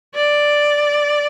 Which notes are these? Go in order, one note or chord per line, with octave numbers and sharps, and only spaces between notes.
D5